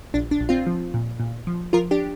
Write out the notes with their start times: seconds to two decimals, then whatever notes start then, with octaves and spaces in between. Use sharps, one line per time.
0.14 A#1 D4
0.31 D4
0.40 A#1
0.49 C4 F4
0.67 F3
0.94 A#2
1.20 A#2
1.47 F3
1.73 F3 F4 A#4
1.91 D4 G4